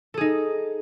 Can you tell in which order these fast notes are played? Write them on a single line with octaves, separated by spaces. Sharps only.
A4 G#4 D#4